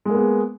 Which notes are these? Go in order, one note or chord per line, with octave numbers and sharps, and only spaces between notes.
G#3 A#3 B3 G#4